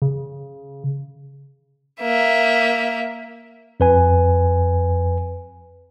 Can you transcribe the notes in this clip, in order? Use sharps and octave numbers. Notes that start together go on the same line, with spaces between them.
C#3
A#3 E5
F2 B4 G#5